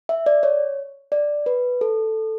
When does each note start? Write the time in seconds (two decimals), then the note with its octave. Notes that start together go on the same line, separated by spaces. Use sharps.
0.09 E5
0.26 D5
0.43 C#5
1.12 D5
1.46 B4
1.81 A4